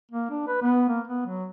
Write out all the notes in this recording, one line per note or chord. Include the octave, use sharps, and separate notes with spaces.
A#3
D4
B4
B3
A#3
B3
F#3